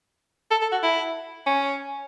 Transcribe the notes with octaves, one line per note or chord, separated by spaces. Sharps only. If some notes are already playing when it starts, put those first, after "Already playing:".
A4
A4
F#4
E4
C#4